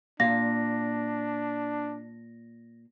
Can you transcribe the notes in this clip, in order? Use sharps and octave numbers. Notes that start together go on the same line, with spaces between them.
A#2 A#3 D4 F5 A#6